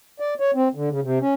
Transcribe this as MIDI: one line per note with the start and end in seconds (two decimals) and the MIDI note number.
0.20 0.34 74
0.40 0.51 73
0.54 0.69 60
0.75 0.89 50
0.90 1.00 49
1.03 1.19 48
1.21 1.34 61